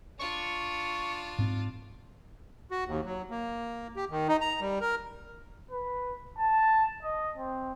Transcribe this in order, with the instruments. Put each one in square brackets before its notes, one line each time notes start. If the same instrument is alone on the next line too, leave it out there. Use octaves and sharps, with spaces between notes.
[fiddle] D4 F4 [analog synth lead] C#6
[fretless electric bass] G#2 C4
[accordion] F#4
D#2
F#3
A#3
G4
D#3
D#4
A#5
G3
A#4
[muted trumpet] B4
A5
D#5
C4